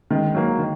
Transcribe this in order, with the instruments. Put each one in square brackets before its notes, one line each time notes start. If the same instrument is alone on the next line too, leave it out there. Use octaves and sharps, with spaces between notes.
[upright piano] D#3 [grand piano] G#3
[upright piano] F#3 A#3
D#3